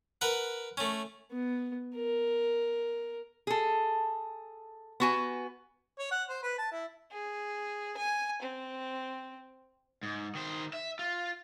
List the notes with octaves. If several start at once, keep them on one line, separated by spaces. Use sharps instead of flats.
A#4 B4 F#5
A3 C#4
B3
A#4
G#4 A4
B3 F#4 G#5
C#5
F#5
C5
B4
A5
E4
G#4
G#5
C4
G#2
D#3 C5
E5
F4